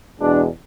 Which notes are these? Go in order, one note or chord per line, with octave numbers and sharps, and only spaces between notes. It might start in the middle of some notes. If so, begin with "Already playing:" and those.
E2 B2 G#3 D4